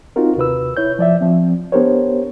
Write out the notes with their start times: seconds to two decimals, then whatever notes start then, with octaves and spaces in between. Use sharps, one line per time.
0.16 C4 D#4 F4 F#4 A#4
0.36 D#2 C3 B4 E6
0.77 E4 C#5 G6
0.99 F3 D5 E5
1.21 F3 C4
1.72 B3 D4 G4 A#4 C5 C#5